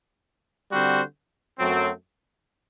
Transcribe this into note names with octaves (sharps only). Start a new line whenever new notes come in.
D3 G3 C4 F#4 C5
F#2 F#3 A3 C4